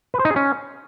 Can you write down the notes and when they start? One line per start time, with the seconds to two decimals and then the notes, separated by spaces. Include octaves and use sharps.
0.14 B4
0.19 C5
0.25 D#4
0.30 G#4
0.36 C#4